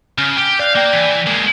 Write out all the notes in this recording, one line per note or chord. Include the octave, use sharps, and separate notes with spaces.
C#3 F6
G4
D5 F5 F#6 G6
A#3 D5 G5
E3 B6
G#3 A#3